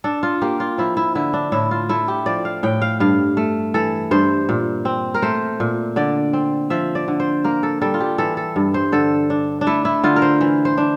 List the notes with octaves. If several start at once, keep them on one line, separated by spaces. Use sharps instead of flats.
D4 A4
F4
A#3 G4
F4
F3 E4
E4
D3 E4
D4
A2 E4
F4
A3 E4
G4
F3 D5
F5
A2 G5
F5
G2 F5
A3
E3 A4
G2 C5
A#2
C4
A#4
A3 C5
A#2
D3 D5
C4
F3 E5
D5
D3
C5
A#3 A#4
A4
G3 A4
F4
G4
E3 A4
A4
G2
C5
D3 A4
D4
D4
A3 E4
E4
D3 F4
A#4
C5
E3
C5
D4